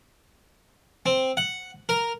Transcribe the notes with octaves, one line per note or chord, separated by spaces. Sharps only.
C4
F#5
A#4